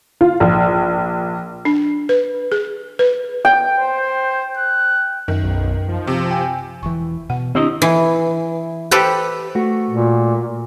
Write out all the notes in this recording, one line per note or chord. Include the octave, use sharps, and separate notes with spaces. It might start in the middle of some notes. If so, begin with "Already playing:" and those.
F4
A#1
D4
B4
G#4
B4
G5
C5
F#6
F#2 D#3
B1
F3
C3 F3
G5 G#5
E1 E3 C#6
B2 F#5
D#3 C4 D4 E4 G4 D#5
E3
G4 A4 B4 C5
A3 F#4
A#2